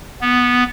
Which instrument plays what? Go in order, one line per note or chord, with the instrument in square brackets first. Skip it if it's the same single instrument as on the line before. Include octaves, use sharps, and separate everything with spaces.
[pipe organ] B3